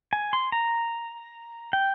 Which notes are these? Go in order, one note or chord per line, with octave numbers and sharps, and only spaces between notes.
G#5
C6
A#5
G5